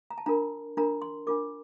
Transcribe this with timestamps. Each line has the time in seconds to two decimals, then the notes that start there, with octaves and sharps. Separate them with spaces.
0.11 A#5
0.18 A5
0.26 D4 F4 A#4 A#5
0.77 D4 F4 A#4 A#5
1.02 C6
1.27 D4 F4 A#4 D6